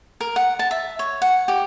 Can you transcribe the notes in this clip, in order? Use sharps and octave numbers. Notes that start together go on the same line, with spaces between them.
A#4
F#5
A5
E5
C#5
F#5
G4